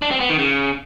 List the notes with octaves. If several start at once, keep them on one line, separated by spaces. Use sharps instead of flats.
D4
C4
B3
D#3
C#3